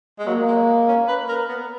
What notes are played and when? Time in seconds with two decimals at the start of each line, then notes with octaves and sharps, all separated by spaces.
0.19 G#3
0.27 F#3 A#3
0.48 G#3
0.88 C#4
1.08 B4
1.29 A#4
1.49 B3